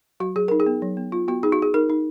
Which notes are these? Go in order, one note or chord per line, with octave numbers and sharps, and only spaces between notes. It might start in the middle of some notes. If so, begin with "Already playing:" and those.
F#3 F#4
F#3 G#4
D#4 A#4
G#4
B3
F#3
B3
B3 F4
B3 F#4
D#4 G#4
F#4
D#4 G#4
D#4 A#4
D#4